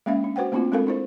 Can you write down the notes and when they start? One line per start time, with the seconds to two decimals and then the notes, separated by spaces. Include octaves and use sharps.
0.06 G#3 A#3 C#4 E5 F5
0.24 D4
0.36 F#4 B4 C5 F#5 G5
0.52 A3 A#3 C4 D4 E4 F4
0.72 G#3 C4 D4 A4 A#4 F5
0.87 D4 E4 C5